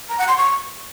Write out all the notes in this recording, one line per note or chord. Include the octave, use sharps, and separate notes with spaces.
A#5
F#5
C6
C#6